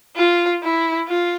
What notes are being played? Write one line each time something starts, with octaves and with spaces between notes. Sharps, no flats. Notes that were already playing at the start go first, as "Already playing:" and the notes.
F4
E4
F4